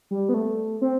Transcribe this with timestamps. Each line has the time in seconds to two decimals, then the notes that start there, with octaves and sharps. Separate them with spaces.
0.11 G3
0.29 B3
0.34 A3
0.81 C4